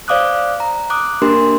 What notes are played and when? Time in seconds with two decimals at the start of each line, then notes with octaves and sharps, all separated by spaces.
0.08 C5 D5 F5 D6 D#6 F#6
0.60 A#5
0.90 D6 D#6 F#6
1.22 A#3 D4 G4 A#4 C6